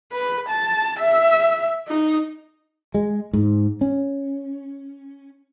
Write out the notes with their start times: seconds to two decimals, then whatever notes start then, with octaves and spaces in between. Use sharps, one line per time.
0.12 B4
0.49 A5
0.99 E5
1.88 D#4
2.94 G#3
3.33 G#2
3.81 C#4